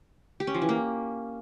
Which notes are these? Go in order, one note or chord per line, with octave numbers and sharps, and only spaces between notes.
G4
C#4
F3
E3
A#3